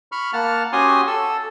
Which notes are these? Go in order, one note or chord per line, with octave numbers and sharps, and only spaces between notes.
B5 C#6 F6
A#3 F#5 A5 F6
C#4 F#4 G4 G#5 C6 D#6
A4 E6